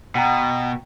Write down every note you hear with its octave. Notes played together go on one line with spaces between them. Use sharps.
B2 F#5 G5 A#5